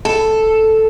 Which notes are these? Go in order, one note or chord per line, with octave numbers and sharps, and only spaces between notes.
A4